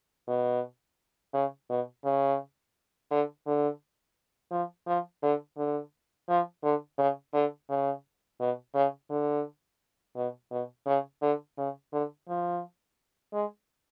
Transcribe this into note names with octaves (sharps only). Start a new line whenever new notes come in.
B2
C#3
B2
C#3
D3
D3
F3
F3
D3
D3
F3
D3
C#3
D3
C#3
B2
C#3
D3
B2
B2
C#3
D3
C#3
D3
F3
G#3